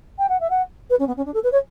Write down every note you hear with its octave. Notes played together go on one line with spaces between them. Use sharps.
G5
F#5
E5
F#5
B4
C#4
B3
C#4
D4
A4
B4
C#5